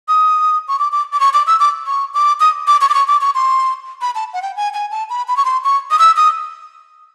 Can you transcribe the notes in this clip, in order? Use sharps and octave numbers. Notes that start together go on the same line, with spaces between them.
D#6
C#6
D6
D6
D6
C#6
D6
E6
D6
C#6
D6
D#6
D6
C#6
D6
C#6
D6
C#6
C6
B5
A5
F#5
G5
G#5
G#5
A5
B5
B5
C#6
C6
C#6
D#6
E6
D#6